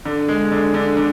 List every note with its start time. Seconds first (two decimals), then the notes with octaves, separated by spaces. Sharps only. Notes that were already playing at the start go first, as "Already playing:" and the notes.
0.05 D3
0.28 G#3
0.51 D3
0.74 D3
0.97 D3